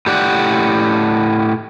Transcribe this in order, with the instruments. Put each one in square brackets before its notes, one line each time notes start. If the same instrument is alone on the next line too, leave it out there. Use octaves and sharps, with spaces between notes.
[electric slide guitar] A2 G4 D5 F#5